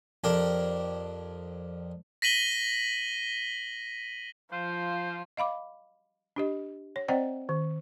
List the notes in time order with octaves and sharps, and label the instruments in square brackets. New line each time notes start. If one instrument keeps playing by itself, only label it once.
[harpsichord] F2 D4 G4 A#4
[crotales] A#6 B6 D#7 F#7 G7
[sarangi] F3 [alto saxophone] F4 [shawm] C5
[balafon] D#5 F5 B5 D6
D4 G4 D#5
C#5
C4 C5 D5 D#5 F#5 G5
D#3